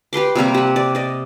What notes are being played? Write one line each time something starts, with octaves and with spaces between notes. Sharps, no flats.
G4 B4 C6 D6
C3 G3 A#3 C4
G4 F#5
D5
D5 D#5